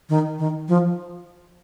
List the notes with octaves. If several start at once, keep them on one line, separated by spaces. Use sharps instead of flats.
D#3
D#3
F3